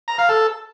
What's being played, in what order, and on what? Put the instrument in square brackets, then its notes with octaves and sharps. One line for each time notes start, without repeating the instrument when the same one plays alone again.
[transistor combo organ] A#5
F5
A4